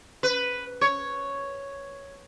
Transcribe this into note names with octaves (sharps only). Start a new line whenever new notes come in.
B4
C#5